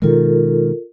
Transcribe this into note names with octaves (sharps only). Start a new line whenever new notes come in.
B2 D#3 G#3 F4 A4 A#4